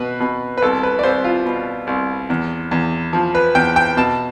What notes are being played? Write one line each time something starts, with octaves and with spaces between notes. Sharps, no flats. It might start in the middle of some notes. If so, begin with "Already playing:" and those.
Already playing: B2 B4
B2
B4
C2 A4
B4
D5
C2 C5
F4
B2
C2
E2
E2
F3
B4
E2 G5
G5
B2 A5